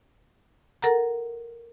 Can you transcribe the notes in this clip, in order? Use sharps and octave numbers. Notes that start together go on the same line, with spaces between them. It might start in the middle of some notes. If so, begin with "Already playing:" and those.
A4 A#4 F#5 A#5